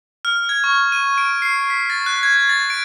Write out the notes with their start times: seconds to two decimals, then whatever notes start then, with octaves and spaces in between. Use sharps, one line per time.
0.25 F6
0.49 G#6
0.64 C#6
0.92 D#7
1.18 D7
1.42 C7
1.70 B6
1.90 A6
2.06 F#6
2.23 G#6
2.49 A6
2.70 D7